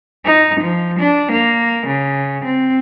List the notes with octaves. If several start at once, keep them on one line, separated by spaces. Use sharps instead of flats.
D#4
F3
D4
A#3
C#3
C4